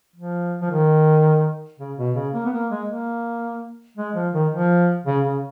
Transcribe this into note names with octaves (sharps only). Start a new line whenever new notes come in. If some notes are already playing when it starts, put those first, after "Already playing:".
F3
F3
D#3
C#3
B2
C#3
A#3
B3
A#3
G#3
A#3
G#3
F3
D#3
F3
C#3
C#3